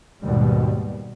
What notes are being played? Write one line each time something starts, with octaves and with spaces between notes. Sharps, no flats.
D#2 G#2 B2 G3